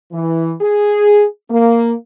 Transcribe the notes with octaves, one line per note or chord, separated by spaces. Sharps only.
E3
G#4
A#3